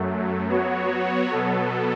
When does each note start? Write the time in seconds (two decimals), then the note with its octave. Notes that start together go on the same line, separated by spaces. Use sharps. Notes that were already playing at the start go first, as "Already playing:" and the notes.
Already playing: F#2 F#3 A3
0.48 F#3 B3 F#4 C#5
1.31 B2 F#3 B3 A4